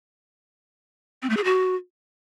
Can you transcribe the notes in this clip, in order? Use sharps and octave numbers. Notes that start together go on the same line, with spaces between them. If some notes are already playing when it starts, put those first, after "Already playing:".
C4
A3
G#4
F#4